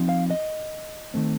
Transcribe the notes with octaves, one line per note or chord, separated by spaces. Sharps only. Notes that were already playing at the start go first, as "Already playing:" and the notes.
Already playing: F3 C4 D#4
F5
D#5
D#3 A3 C4